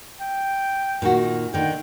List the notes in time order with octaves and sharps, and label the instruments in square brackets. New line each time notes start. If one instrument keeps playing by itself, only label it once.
[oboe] G5
[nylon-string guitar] A#2 D#3 F#4
[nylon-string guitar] D3 D#3 [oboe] G5